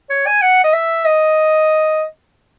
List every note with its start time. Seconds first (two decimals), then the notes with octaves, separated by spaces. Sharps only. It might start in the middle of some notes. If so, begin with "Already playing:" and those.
0.10 C#5
0.26 G#5
0.42 F#5
0.64 D#5
0.73 E5
1.05 D#5